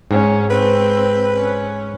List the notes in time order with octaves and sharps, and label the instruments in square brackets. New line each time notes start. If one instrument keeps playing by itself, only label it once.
[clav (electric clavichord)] G#2 [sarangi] C#4
[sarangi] C4 [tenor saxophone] B4
[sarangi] C#4